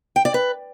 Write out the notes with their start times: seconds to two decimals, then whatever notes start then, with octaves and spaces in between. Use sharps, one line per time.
0.16 G5
0.25 D5
0.34 B4